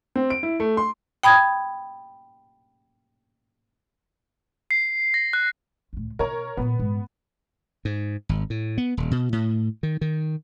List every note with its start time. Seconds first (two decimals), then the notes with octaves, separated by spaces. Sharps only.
0.16 C4
0.30 D7
0.43 E4
0.60 A3
0.77 C6
1.23 G5 B5 D#6 G#6
4.71 C7
5.14 A#6
5.33 F#6
5.93 C#2 A2
6.19 B2 A#4 C#5 A#5
6.57 A#2 D#3 B3
6.79 G#2
7.85 G#2
8.29 G#1
8.50 A2
8.78 B3
8.97 D#1
9.11 B2
9.33 A2
9.83 D#3
10.01 D#3